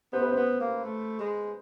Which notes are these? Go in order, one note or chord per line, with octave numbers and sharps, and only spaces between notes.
B3 C5
B4
C5
B3
A#3
A3
G#3